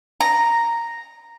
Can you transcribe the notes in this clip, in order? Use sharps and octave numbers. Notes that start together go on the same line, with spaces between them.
A#5